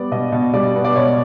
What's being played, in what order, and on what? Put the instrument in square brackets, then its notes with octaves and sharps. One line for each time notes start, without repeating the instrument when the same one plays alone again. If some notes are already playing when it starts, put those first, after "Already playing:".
Already playing: [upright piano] G3 B3 D5
B2 D#5
B2
G3 D5
B3
D5
B2 C#5